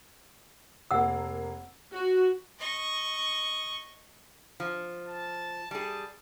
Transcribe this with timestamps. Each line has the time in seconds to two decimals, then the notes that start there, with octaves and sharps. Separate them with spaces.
0.91 F1 A#3 F#5 E6
1.94 F#4
2.59 D#5 C#6
4.60 F3
5.07 A5
5.71 G3 G#4 A5